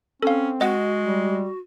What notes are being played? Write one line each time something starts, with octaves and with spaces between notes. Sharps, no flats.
C4 C#4 A4 F5
G#3 F#4 D#5 F#5
G3